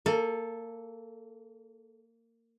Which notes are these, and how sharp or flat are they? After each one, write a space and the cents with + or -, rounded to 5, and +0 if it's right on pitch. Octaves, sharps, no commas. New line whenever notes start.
A#3 -25 A4 -5